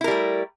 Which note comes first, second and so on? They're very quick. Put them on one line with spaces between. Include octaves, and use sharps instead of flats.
E4 A#4 G3 A3